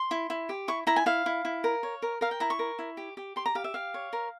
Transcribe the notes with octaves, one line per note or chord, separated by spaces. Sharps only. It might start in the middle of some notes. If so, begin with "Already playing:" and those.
Already playing: C6
E4
E4
G4
E4 C#6
E4 A#5
G#5
E4 F5
E4
E4
A#4
C#5
A#4
A#4 F5
G5
E4 A#5
C#6
A#4
E4
G4
G4
G4 C6
A#5
G4 F5
E5
G4 F5
C#5
A#4